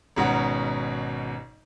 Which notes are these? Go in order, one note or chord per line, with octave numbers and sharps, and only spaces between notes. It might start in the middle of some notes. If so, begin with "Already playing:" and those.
G#1 G#2 B2 C#4 F#5 A#5